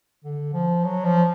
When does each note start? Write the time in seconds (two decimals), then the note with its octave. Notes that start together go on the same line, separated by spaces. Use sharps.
0.24 D3
0.54 F3
0.84 F#3
1.05 F3